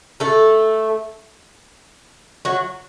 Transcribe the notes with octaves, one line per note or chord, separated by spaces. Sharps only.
A3 A4
F#3 F#4